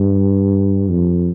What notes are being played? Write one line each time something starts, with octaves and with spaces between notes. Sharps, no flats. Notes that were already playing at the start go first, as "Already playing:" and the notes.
Already playing: G2
F2